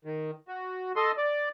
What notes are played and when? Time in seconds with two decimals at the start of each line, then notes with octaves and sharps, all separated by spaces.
0.05 D#3
0.48 F#4
0.96 A4 D#5 C6
1.18 D5